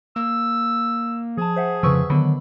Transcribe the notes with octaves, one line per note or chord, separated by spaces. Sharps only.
A#3 E6
F3 G#4 A5
C5 E5 F#5
F2 C#3 F3 B4 C#6 E6
D3 D#3 F#3 B3 B5